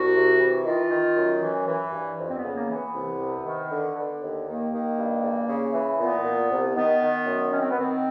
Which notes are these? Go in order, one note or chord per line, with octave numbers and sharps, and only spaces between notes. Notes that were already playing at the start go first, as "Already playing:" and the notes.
Already playing: C2 F#4
C3
E3
D#3 F4
D#3
F#2
E3
E3
G2
F2
C4
B3
C#3
A#3
E3
B3
C2
C3
D#3
D3
D3
D#2
D#3 A#3
D#3
G2
E2
C#3
E3
A#2 B3
A#2
C2
D#3 B3
D#3
F#2
D#3 C#4
C4
B3
D#3 C4